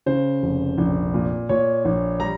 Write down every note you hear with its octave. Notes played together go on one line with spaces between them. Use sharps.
C#3 C5
F1
A#1
A#2
A#2 C#5
A#1
G3 A#5